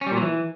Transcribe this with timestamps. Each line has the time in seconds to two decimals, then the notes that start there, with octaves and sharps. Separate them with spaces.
0.01 C#4
0.06 G3
0.12 A#2
0.17 F#3
0.22 E3